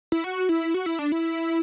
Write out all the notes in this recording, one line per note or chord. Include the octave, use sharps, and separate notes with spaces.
E4
F#4
E4
F#4
E4
D4
E4